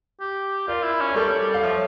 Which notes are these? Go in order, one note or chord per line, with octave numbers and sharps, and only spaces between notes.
G4
F4 A#4 D5
E4
C#4
A#4
G3 A4 C#5
G3
F5
F3 C#5 E5